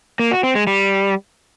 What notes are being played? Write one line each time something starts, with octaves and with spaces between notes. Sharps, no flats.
A#3
F#4
C4
G#3
G3